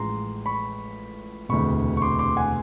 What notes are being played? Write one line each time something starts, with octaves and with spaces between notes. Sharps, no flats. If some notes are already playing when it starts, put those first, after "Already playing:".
Already playing: A1 A2 F3 G#3 A#5 C6
B5 C#6
E1 D2 C3 B5 C#6
C#6
C6 D6
C6 D6
F#5 G#5